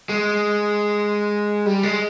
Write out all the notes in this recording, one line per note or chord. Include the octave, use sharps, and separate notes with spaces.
G#3
G3
G#3